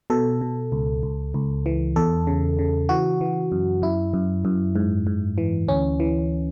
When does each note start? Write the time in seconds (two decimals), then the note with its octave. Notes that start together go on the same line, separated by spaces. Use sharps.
0.10 B2 A4
0.41 B2
0.72 C#2
1.03 C#2
1.34 C#2
1.66 E3
1.96 E2 A4
2.27 C#3
2.59 C#3
2.89 E3 F#4
3.21 E3
3.52 F#2
3.82 F#2 E4
4.14 F#2
4.45 F#2
4.76 G#2
5.07 G#2
5.38 E3
5.68 D2 C#4
6.00 E3